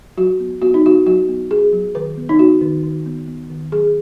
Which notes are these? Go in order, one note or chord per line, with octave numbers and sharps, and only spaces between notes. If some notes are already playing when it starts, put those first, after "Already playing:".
F#3 F#4
B3
B3 F#4
D#4
F#3 F#4
F#3 F#4
B3
B3 G#4
F#3
D#3 B4
B3
D#4
B3 F#4
D#3
D#3
B3
B3
D#3
F#3 G#4